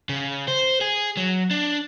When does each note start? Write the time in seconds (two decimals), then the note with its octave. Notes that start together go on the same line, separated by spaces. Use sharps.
0.09 C#3
0.48 C5
0.81 G#4
1.17 F#3
1.51 D4